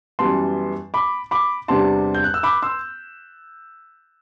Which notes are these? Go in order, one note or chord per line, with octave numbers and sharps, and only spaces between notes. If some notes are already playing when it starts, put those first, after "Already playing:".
F#2 E3 G3 B3 A5 C6
B5 D6
B5 D6
E2 C3 G3 D4 A5 C6
G6
F#6
E6
B5 D6
C6 E6